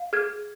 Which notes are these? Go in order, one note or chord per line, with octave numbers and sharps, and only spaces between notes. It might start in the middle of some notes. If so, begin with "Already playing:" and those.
Already playing: F5
G#4 F6 G#6